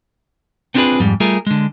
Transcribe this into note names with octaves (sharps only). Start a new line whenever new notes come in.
B3 C4 D4 F4 G#4 B4
F2 G#2 G3
G3 A3 F4 G#4 A#4
D3 G#3